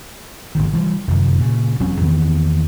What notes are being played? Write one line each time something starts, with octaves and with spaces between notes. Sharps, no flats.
G#1 D2 D#3
E3 F3 G3
F1 F#2 D#3
A#2 C#3
E1 F#3 C4 C#4
E2 D#3 B3